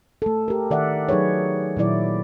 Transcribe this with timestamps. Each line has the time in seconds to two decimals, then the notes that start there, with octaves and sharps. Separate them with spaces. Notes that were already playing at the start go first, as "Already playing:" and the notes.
0.22 A3 A4
0.48 G4 A#4
0.70 D#3 D5 E5 F#5
1.09 F#3 D#4 G#4 B4 C#5
1.77 A#2 D#3 F#3 E4 D5